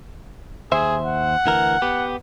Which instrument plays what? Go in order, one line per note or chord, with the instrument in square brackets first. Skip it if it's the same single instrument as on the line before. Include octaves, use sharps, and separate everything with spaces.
[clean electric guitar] D#2 C5 E5 [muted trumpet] G#4
[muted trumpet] F#5
[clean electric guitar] D2 E3 A#4
B3 G4